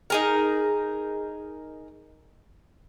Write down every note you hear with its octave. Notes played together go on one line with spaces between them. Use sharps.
D#4 G#4 A#4